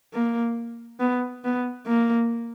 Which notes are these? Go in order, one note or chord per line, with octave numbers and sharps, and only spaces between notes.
A#3
B3
B3
A#3